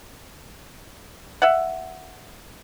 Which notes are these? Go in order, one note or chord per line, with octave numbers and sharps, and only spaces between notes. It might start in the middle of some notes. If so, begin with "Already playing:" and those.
E5 F#5